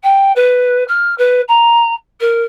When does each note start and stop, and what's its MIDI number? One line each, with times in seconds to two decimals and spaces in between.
0.03 0.32 79
0.35 0.84 71
0.88 1.14 89
1.18 1.41 71
1.48 1.93 82
2.20 2.43 70